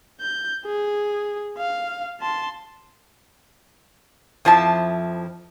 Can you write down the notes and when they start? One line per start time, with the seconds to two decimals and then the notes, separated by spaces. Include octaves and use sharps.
0.21 G6
0.66 G#4
1.58 F5
2.20 A5 C6
4.45 F2 F3 E4 A5